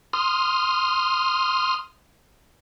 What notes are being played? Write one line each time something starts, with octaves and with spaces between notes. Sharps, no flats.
C6 D#6 F6